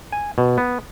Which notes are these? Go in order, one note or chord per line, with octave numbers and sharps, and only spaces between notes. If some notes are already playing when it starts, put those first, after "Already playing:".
G#5
B2
B3